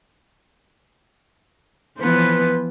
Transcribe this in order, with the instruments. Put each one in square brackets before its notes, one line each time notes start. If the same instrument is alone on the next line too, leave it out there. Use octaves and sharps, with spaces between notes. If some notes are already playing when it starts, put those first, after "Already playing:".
[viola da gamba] E3 F3 B3 [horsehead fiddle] B4 C5